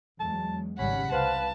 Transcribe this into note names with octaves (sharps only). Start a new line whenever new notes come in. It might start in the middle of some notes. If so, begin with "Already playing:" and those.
E2 F#3 G#3 A5
G#1 C#3 G3 C#4 F#5 B5
C2 B4 C5 F5 A5